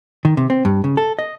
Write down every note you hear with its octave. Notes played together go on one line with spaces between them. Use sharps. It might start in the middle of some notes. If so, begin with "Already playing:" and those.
D#3
C3
C4
G2
C#3
A4
D#5